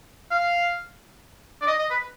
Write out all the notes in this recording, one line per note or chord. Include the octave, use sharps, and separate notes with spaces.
F5
D5
D#5
D#5
B4